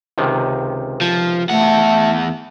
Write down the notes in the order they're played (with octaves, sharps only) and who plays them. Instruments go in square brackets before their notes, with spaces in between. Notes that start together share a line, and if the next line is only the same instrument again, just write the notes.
[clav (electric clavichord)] C#2 C3 D#3
[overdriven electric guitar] F3
[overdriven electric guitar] E2 F#5 [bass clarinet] A3